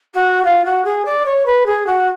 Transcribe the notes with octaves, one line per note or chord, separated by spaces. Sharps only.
F#4
F4
F#4
G#4
D5
C#5
B4
G#4
F#4